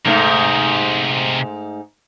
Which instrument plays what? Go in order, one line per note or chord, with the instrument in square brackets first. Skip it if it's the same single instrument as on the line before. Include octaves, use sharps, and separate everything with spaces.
[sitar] G#2 A3 D#4 [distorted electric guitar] C3 A#4